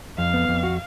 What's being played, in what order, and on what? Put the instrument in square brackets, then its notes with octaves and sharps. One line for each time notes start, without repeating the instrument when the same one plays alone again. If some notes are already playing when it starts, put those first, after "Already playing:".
[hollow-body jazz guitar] F2 [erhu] F5
[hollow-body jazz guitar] B3
F2
F#4